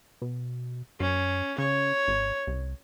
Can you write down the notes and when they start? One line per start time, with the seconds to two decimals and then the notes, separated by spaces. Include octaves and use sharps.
0.22 B2
1.00 F#2 C#4
1.58 C#3 C#5
2.08 G#1
2.47 C2